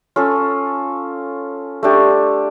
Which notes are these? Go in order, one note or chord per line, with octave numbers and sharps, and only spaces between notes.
C#4 F4 A4
A3 D4 G4